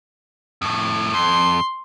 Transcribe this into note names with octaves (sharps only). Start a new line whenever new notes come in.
F2 A2
F2 C6